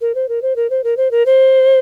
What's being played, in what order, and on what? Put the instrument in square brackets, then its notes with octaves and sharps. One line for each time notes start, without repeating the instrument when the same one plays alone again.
[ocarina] A#4
C5
A#4
C5
A#4
C5
A#4
C5
A#4
C5